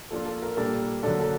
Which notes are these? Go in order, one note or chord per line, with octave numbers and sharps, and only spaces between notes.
F3 A#3 D4 F4 A4
A4
A#4
A#2 G3 A#3 D4 A4
D3 F#3 A#3 D4 A4
A4